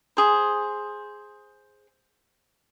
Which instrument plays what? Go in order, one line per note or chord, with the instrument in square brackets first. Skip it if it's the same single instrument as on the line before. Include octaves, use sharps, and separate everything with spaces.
[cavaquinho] G#4 C5